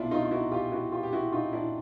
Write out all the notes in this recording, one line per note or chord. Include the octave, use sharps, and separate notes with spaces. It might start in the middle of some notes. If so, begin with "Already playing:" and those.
Already playing: C2 B2 D4 E4 F4
D#4 F4
F4
E4 F#4
F4 G4
E4 F#4
F4 G4
G4
E4 F#4
D#4 F4
D4 E4